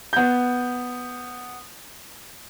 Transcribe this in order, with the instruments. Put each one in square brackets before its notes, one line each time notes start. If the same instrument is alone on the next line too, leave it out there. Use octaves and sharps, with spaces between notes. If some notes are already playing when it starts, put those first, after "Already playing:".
[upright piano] B3 G6